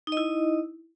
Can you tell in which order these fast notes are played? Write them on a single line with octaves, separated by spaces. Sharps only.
D#4 D#5 E4